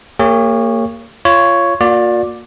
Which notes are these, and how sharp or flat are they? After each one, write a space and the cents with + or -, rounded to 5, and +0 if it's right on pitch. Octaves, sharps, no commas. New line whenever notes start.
A#3 -25 G4 +45 C#5 +0
F4 -20 C#5 +5
A#3 +0 F4 +45 D5 +0